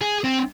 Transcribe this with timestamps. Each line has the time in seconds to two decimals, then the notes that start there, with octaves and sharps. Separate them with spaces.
0.01 G#4
0.24 C4